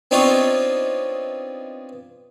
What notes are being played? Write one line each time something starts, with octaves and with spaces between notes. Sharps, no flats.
B3 C4 D4 D#4 F4 C#5